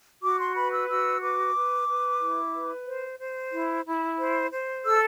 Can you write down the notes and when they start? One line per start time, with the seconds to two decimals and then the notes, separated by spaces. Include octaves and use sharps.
0.22 F#4 D6
0.39 C6
0.55 B4 B5
0.72 E6
0.88 F#4 E6
1.21 B4 D6
1.55 B4
1.88 B4
2.20 E4
2.53 B4
2.86 C5
3.19 C5
3.52 E4
3.84 E4
4.18 C5
4.51 C5
4.84 A4 E6